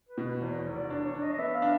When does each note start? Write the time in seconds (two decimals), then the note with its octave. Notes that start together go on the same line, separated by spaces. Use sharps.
0.09 B4
0.18 B2
0.26 B4
0.41 E2 C5
0.58 C#5
0.66 F1
0.74 D5
0.90 D4 C#5
1.06 C#5
1.15 D4
1.22 D#5
1.33 D#5
1.38 B3 E5
1.55 F5
1.62 D4